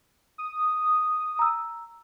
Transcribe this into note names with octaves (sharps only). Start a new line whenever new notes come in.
D#6
A#5 E6